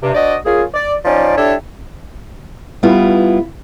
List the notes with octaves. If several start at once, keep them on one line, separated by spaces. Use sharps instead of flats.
G2 C3
D4 F#4 C5 D5 D#5
A#3 C#4 F4 G#4
D5
F3 C#4 D#4 D5
D4 E4 G4 A4 C#5 E5
G3 B3 E4 F4